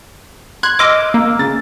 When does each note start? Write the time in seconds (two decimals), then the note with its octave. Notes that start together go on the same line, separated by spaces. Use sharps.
0.63 C6 F#6 G#6
0.79 D#5 C6 D6 E6 F6
1.14 A#3 A#5
1.39 C#3 A6